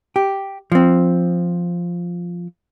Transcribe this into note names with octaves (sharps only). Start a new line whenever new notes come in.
G4
F3 C4